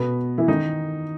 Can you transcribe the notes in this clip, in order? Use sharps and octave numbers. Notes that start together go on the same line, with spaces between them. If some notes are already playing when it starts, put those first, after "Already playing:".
Already playing: B2 B3
E3 E4
D#3 D#4